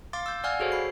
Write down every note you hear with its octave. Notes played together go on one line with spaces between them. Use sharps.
F5 C6 D6 A6
E6 G6
D5 F5 F#5 G#5 F6 G#6
F#4 G#4 A4 C5 C#5
B5 C7